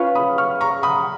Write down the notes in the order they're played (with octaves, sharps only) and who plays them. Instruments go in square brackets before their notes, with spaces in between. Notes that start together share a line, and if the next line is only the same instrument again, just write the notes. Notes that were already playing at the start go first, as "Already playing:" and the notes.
Already playing: [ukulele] C#4 F4 B4 F5 [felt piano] C#6 F6
[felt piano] B5 D#6
C#6 F6
A#5 C#6
B5 D#6